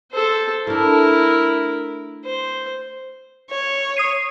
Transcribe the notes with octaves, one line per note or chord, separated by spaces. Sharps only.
A4 C5
A3 D4 E4 A#4
C5
C#5
D#6 C7 D#7